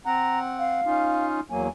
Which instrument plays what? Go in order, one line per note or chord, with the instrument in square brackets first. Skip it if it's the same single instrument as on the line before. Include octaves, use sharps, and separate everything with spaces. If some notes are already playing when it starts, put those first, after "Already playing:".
[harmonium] C4 F#5 [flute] A#5
[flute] F5
[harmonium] C#4 D#4 F4
[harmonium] E2 F#3 A#3 [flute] G#5